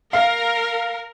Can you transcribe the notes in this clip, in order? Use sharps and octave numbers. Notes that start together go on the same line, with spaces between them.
A#4 F5